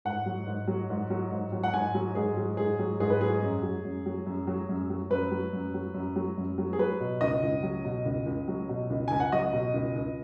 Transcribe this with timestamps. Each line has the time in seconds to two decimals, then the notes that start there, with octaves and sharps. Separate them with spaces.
0.05 G#2 F#5
0.26 F#3
0.47 G#2
0.68 F#3
0.90 G#2
1.10 F#3
1.32 G#2
1.52 F#3
1.63 F#5
1.74 G#2 G#5
1.94 F#3
2.15 G#2 G#4
2.37 F#3
2.57 G#2 G#4
2.79 F#3
3.00 G#2 G#4
3.10 B4
3.21 F#3 G#4
3.42 F#2
3.63 F#3
3.85 F#2
4.06 F#3
4.27 F#2
4.47 F#3
4.69 F#2
4.90 F#3
5.10 F#2 B4
5.31 F#3
5.53 F#2
5.74 F#3
5.94 F#2
6.16 F#3
6.38 F#2
6.58 F#3
6.73 G#4
6.79 F#3 B4
7.00 B2
7.21 C#2 D#5
7.43 C#2
7.63 F#3
7.85 B2
8.06 C#2
8.26 C#2
8.48 F#3
8.69 B2
8.90 C#2
9.08 C#2 G#5
9.20 F#5
9.32 F#3 D#5
9.53 B2
9.74 C#2
9.96 C#2